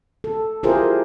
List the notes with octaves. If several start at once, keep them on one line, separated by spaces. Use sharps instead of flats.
A4
E4 F4 G4 G#4 A#4 C5